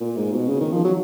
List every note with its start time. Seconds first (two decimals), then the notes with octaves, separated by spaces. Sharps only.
0.01 A#2
0.17 G#2
0.32 B2
0.48 C#3
0.61 D#3
0.72 F3
0.84 F#3